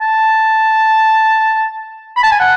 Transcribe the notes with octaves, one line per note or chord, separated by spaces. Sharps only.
A5
B5
A5
G#5
F#5